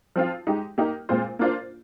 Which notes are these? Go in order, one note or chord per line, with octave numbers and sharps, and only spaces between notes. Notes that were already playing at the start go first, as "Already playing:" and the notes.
F3 C4 F4
G#3 D#4 G4
A#3 D#4 G4
A#2 G#3 C4 F4 C5
A#3 D4 F4 C5